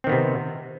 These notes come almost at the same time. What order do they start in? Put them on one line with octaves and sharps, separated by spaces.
C4 D#3 B3 C3